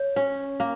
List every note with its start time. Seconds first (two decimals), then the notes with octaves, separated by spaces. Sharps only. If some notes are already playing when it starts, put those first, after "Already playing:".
Already playing: C#5
0.16 C#4
0.60 A#3